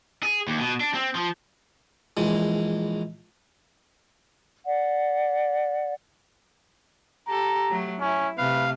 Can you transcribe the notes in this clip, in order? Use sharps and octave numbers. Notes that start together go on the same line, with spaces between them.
G#4
D#2
B2
D4
C4
F3
A#1 E3 G#3
D5 F#5
G4 A4 A#5
F#3 A3
C#4 E4
C3 A3 B4 F5